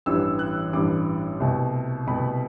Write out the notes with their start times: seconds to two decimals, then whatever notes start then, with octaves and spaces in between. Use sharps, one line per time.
0.06 A1 G2 E3 G3 E6
0.39 F#6
0.73 A1 G2 E3 G3 D6
1.40 C2 B2 A3
2.07 C2 B2 A3 B5